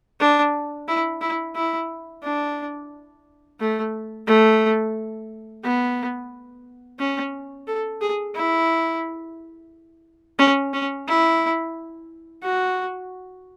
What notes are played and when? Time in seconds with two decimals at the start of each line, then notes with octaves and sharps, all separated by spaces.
0.20 D4
0.88 E4
1.21 E4
1.55 E4
2.23 D4
3.60 A3
4.27 A3
5.64 B3
6.99 C#4
7.67 A4
8.01 G#4
8.36 E4
10.39 C#4
10.73 C#4
11.08 E4
12.43 F#4